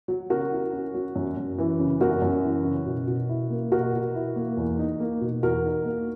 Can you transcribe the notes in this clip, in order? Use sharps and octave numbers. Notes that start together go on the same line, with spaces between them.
F#3
C#3 F#4 A#4
E4
C#4
F#3
F#2
F#2
E3
C#3
F#2 F#4 A#4
F#2
E3
C#3
B2
B2
E4
A#3
B2 F#4 A#4
B2
E4
A#3
E2
D#4
A#3
B2
E2 F#4 A#4
D#4
A#3